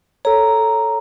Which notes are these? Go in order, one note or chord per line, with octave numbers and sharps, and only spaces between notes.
A4 C#5 A#5